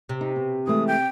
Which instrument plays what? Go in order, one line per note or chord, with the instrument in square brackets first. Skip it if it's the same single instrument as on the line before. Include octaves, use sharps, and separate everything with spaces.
[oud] C3
[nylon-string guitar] D#4
B2
[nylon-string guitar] E3 G#3 A3 [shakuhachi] D#6
[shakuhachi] G5